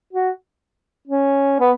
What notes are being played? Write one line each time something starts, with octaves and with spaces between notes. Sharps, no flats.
F#4
C#4
B3